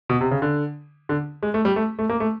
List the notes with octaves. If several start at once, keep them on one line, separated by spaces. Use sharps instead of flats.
B2
C3
C#3
D3
D3
G#3
A3
G3
A3
A3
A#3
A3